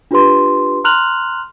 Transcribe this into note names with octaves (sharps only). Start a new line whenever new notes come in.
D4 F4 G4 B4 C6
A#5 C6 F6 F#6 F7 F#7